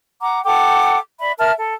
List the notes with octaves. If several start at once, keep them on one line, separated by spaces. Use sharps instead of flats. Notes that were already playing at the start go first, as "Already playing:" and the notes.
F#5 A#5 D6
A4 F#5 G5 D6
D5 E5 B5
A#4 E5 A5 F6
A4